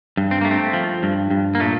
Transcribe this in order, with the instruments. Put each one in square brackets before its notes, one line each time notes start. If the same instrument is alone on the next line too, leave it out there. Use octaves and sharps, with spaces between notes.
[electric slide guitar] G2
C4
A3 A#3
C4
F3
G2
G2
A#3
A#2 A3